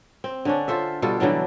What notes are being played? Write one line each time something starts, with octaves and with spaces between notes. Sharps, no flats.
C4
D3 C#4 D4
F4 A4 C5 E5
B2 G3 F4 A4
D3 E3 F#3 G3